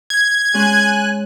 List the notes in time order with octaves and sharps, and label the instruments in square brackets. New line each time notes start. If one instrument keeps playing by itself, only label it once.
[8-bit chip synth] G#6
[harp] G#3 C#4 G#4 [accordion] G#5 F#6